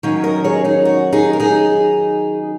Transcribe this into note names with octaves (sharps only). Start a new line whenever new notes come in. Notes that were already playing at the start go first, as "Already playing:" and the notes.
D#3 F#3 C#4
A#4 D#5
G#4 C#5
D#4 G#4
F#4
D#4 G#4
A#4
D#4 G#4